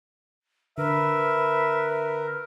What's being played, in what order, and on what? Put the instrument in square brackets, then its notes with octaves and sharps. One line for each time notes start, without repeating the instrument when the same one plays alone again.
[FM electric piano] D3 [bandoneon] A#4 [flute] B4 [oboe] E5